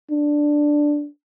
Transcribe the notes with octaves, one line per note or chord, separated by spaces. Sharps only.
D4